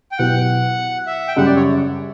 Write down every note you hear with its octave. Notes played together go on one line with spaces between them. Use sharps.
G5
B2 F#3 B3 E4 G4 F#5
E5
G5
F#2 C#3 G3 F#5
D5
C#5